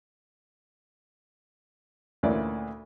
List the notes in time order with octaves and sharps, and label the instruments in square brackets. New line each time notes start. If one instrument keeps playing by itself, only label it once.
[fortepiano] D2 A#2 E3 C#4 D5